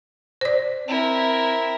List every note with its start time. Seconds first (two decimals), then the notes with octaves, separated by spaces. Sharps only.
0.41 C5 D5
0.88 C4 E4 A#4